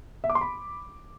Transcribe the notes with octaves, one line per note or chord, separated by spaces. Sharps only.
E5
D6
C6
B5